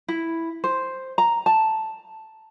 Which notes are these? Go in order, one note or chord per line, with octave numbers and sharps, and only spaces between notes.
E4
C5
A#5
A5